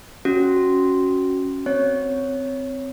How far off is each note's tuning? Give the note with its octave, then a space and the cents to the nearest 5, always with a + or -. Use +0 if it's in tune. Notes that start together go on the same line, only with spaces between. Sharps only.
C#4 +0 F#4 +0
C4 -10 C#5 +0